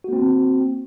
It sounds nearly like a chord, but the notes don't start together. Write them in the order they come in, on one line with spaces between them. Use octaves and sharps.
F#4 A#3 C4